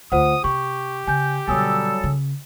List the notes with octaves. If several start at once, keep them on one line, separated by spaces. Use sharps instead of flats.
D2 F4 C5 F#5 D#6
C3 G4 C#6
C#3 G#5 G6
B2 D3 F#3 G3 A4 G#5 D#6 E6
C#3